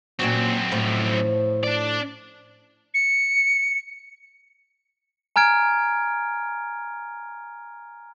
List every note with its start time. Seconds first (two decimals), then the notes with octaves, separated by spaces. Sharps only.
0.19 F#2 A#2 C4 C#4 F#4
0.72 A2 F3
1.64 D4 D5
2.94 C#7
5.36 G#5 A#5 F6 G#6 D7